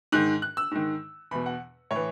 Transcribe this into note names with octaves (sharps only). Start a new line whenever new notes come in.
G#2 D#3 F#6
F#6
E6
G#2 D#3
E2 B2 B5
F#5
A2 C#5
E3